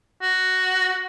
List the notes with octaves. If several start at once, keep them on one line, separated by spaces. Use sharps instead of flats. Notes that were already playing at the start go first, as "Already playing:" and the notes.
F#4